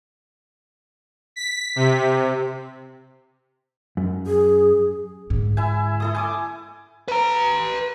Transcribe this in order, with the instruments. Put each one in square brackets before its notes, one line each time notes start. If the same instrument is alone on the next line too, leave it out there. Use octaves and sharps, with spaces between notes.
[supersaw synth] B6
C3
[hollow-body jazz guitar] F#2
[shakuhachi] G#4
[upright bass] G#2 D3
[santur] E4 E5 G#5
E4 A4 D#6
G#5 D6 D#6
[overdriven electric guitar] B4 A#5